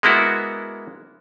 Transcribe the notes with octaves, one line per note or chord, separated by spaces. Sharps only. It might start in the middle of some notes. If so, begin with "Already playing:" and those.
G#3 A#3 B3 E4 F#4